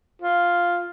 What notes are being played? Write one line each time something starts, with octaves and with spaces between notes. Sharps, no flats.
F4